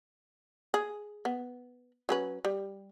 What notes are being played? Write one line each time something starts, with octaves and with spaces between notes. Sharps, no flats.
G#4
B3
F#3 C#4 B4
G3